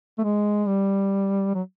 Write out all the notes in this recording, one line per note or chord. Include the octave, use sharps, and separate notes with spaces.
A3
G#3
G3
F#3